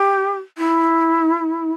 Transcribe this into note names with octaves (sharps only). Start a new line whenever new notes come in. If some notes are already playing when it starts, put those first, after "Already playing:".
Already playing: G4
E4